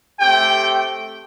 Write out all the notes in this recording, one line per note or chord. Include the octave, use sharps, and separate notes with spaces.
A3 C4 G4 G5